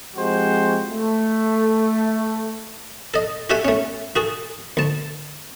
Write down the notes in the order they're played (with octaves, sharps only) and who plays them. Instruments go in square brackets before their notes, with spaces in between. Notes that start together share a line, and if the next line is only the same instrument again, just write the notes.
[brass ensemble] F3 G#3 C4 F#4 G4 C5
A3
[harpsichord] A4 D#5
F#4 G4 A4 E5 F#5 G#5
A3 C#4
F#4 G#4 A4
D2 A5